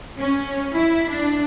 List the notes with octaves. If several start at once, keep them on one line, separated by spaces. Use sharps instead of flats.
C#4
E4
D4